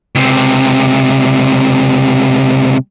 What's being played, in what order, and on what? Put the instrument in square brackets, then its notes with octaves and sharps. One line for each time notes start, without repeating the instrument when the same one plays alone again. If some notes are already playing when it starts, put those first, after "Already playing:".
[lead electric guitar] C#2 C3